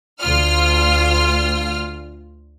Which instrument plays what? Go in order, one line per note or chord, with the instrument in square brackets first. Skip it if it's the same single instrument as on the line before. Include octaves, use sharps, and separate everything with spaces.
[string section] D2 F4 F6